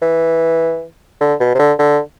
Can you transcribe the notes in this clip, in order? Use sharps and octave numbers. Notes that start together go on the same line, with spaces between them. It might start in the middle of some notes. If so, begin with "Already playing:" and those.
E3
D3
B2
C3
D3
D3